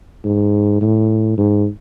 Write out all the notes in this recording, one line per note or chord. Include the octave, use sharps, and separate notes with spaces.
G#2
A2
G#2